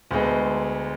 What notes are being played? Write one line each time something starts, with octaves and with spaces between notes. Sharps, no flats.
D2 D3 G#3 B3